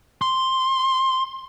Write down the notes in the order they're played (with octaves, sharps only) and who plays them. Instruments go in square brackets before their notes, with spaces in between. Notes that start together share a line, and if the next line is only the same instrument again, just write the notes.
[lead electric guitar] C6